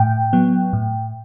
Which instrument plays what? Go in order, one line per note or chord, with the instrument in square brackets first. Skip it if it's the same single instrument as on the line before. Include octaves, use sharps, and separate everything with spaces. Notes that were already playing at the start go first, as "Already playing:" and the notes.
Already playing: [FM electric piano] A2 G5
F#3 B3
A2